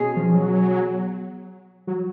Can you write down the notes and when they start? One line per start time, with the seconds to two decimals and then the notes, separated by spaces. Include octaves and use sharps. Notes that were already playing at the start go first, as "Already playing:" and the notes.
Already playing: B2 G#3 C#4 G#4
0.16 F3
0.33 F#3
1.87 F#3